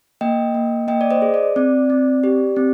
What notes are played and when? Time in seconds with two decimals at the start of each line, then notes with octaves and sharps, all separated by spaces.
0.21 A#3 D#5 G5
0.54 A#3
0.88 A#3 D#5 G5
1.01 D5
1.11 C5 D#5
1.22 G#4
1.34 D5
1.56 C4 D5
1.90 C4
2.24 G4
2.56 C4